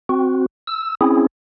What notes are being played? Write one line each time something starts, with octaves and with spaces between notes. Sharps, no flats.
C4 F#4
E6
C4 C#4 E4 G#4